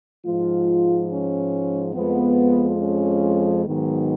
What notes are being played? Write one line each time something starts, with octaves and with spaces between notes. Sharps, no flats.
G#2 F3 G#3 F4
C#4
F2 F3 G#3 B3
C#4
G#2 D#3 F#3 B3